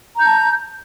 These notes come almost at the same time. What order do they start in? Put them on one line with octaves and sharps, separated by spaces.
A#5 G6 A5